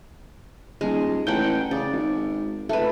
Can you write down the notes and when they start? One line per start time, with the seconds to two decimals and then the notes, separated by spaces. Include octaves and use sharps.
0.81 D#1 G#3
1.27 A1 F#5 G5
1.71 C#3 D5
1.93 G#1
2.69 F1 A3 B4